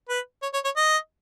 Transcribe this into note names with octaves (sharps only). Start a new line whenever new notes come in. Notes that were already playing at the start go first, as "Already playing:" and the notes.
B4
C#5
C#5
C#5
D#5